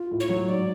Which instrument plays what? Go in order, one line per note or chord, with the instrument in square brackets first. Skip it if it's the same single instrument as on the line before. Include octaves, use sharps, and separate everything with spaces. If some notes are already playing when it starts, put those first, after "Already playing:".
Already playing: [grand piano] F4
A2
[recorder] C#5
[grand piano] F#3
[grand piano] G#2 [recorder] D5